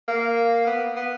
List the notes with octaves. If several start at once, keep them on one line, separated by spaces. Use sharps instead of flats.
A#3
B3
B3